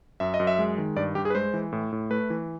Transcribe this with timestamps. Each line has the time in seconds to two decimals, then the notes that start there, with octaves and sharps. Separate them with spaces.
0.20 F#2 E5
0.34 D#5
0.40 F#2
0.47 E5
0.58 G#3
0.78 D#3
0.96 G2 D5
1.15 G2 G4
1.25 G#4
1.30 B4
1.35 G#3 C5
1.54 E3
1.72 A2
1.92 A2
2.10 A3 B4
2.30 E3